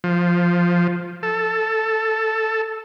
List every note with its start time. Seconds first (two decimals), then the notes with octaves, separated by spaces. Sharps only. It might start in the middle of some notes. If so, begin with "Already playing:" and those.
0.04 F3
1.23 A4